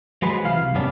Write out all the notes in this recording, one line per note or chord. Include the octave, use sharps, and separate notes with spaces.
F#3 G#3 G#4 B4 C5
C2 E3 F5
C2
F#2 C3 B3 C#4 D4